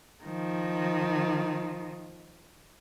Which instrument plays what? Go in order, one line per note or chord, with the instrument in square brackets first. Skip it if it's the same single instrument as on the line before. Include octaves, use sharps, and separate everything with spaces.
[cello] D#3 F3